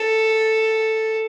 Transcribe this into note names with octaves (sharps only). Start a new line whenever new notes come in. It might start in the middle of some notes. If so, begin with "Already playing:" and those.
Already playing: A4